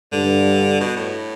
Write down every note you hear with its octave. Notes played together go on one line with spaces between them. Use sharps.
G2 D3
B2
A2